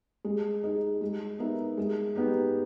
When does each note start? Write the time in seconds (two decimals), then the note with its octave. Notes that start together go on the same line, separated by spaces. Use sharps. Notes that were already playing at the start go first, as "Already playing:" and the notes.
0.25 G#3
0.63 D#4 G#4 D#5
1.01 G#3
1.39 B3 D#4 A#4 E5
1.77 G#3
2.15 B3 D#4 G4